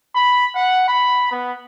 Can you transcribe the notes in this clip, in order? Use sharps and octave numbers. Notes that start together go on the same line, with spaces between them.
B5
F#5
B5
B3